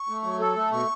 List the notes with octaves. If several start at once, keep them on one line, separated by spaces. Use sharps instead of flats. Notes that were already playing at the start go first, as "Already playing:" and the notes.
Already playing: C#6
A3
F#3
A4
A3
B2 C#6